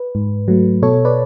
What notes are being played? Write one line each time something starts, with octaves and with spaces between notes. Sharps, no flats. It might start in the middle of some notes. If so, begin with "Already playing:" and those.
Already playing: B4
G#2
F#3 A3
B2 A4 C#5
B4 D5